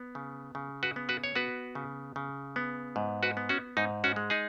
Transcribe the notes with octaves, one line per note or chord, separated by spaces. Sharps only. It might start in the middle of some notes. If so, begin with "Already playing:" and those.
Already playing: B3
C#3
C#3
F#4 B4
B3
F#4 B4
C#5
B3 F#4 B4
C#3
C#3
B3
G#2
F#4 B4
B3
C#4 F#4
G#2 D#4
C#4 F#4
G#3
D#4 G#4